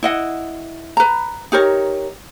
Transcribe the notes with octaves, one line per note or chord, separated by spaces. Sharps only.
E4 D#5 F#5
B4 A#5
D#4 G4 A#4 C#5